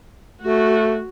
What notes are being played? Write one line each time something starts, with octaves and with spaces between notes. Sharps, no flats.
A3 F#4